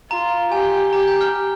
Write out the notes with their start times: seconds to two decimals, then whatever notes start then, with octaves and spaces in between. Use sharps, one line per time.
0.11 F4 A#5
0.52 G4 G#5
0.93 G4 A#5
1.07 G6
1.21 F6